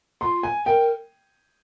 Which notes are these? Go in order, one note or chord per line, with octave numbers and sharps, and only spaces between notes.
F4 C6
G#5
A#4 G5